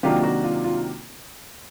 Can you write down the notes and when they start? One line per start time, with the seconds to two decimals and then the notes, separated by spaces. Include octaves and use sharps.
0.03 C3 D#3 F#3 A#3 D4 F4 G4
0.23 F#4
0.44 F4
0.64 F4